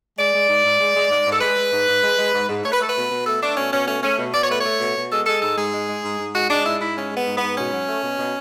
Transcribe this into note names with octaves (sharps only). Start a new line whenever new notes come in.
G#3 D5
G#3
G#2
G#2
G#3
G#3
G#2
G#2 A4
G#3 B4
G#3
G#2
G#2
G#3
G#3
G#2
G#2
A3 C#5
B4
A3 A4
B4
B2
B2
A3 A4
A3 D4
B2 C#4
B2 C#4
A3 C#4
A3 C#4
B2
B2 D5
C#5
A3 B4
A3 C#5
B2
B2
G#3 A4
G#3 A4
G#2 A4
G#2 G#4
G#3
G#3
G#2
G#2
G#3 F#4
G#3 D4
G#2 E4
G#2 E4
G#3 C#4
G#3 B3
G#2
B3
G#2
B2 C#4
F#3
A3
B2
B2